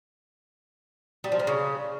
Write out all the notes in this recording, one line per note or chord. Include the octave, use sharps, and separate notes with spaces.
G3
F3
A#3
C#3